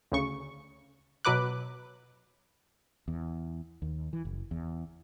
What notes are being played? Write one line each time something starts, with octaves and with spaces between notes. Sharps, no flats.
D2 C#3 C#6
B2 F#3 B4 D6 F#6
E2
D#2
E3
F#1
E2